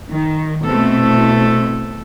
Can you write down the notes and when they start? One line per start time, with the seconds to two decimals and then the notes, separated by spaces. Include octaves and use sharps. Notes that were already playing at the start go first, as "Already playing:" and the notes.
0.11 D#3
0.64 B2 A3 C4 E4 A4